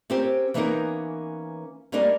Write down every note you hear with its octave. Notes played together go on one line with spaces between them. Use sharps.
C4 C#4 G4 A#4 C5
E3 A#3 B3 C#4 D#4 A#4
G3 A#3 C#4 D4 A#4 D#5